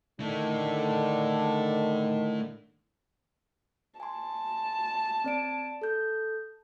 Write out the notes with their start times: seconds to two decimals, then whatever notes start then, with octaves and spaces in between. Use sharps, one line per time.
0.20 D3 D#3 A3 D4 E4
4.00 G#5 A5 C6
5.24 C4 D5 D7
5.82 A4 G6